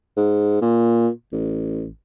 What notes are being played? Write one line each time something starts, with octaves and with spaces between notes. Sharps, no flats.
G#2
A#2
A1